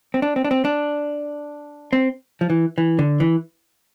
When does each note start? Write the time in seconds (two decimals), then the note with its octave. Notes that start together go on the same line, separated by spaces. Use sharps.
0.14 C4
0.22 D4
0.36 C4
0.45 D4
0.51 C4
0.65 D4
1.93 C4
2.41 F3
2.50 E3
2.78 E3
2.99 D3
3.20 E3